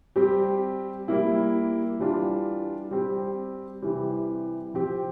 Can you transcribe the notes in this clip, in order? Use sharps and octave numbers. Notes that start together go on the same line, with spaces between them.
G3 C4 G4
G3 A#3 E4
E3 G3 D4 F4
G3 C4 G4
C3 E3 G3
F3 C4 G4